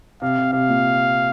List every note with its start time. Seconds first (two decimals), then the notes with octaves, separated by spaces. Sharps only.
0.22 C3 F5
0.38 C3
0.53 C3 F5
0.69 A#2